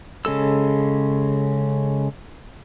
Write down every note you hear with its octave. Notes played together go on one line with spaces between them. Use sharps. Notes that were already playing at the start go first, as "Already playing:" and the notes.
C#3 G#3 A4 E6